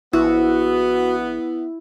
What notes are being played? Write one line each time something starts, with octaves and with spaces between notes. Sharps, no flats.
A#1 B3 E4 F#4